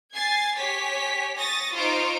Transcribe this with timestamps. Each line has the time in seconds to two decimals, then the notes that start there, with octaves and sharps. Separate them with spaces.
0.13 G#5 G#6 A6 C7
0.56 G4 C#5 G#5 B6
1.37 C#6 D#6 A6 A#6
1.73 D#4 F4 C5 C#6 D7